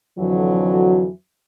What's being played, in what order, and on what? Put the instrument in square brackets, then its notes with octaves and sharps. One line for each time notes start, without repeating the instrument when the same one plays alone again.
[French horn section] F2 D3 E3 F#3